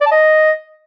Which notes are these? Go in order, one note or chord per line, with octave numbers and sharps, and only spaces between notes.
D5
A5
D#5